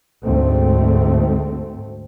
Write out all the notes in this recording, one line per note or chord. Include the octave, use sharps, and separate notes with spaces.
D2 G#2 A3 C4